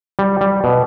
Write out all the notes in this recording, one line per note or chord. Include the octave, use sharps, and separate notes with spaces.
G3
G3
B2